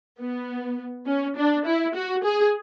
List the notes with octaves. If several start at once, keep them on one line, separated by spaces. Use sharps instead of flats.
B3
C#4
D4
E4
F#4
G#4